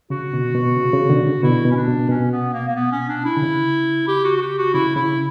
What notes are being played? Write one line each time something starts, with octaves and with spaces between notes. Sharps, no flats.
C#3 F#4
B2 D3
B2
C#3
C#3
B2 D3
C#3
B2 D3 E4
B2
C#4
D4
B2
B2 C#4
B3
A#3
A#3
B3
C#4
D4
E4
D3
C#3
G4
F#4
F#4
G4
F#4
C#3 E4
C#3 E4